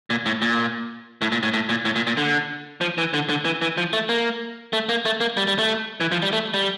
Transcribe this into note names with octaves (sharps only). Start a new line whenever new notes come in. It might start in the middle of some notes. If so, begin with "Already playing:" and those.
A#2
A2
A#2
A2
A#2
A2
A2
A#2
A2
A#2
A#2
D3
F3
E3
D3
D3
E3
E3
F3
A3
A#3
A3
A#3
A3
A#3
G3
G3
A3
E3
F3
G3
A3
G3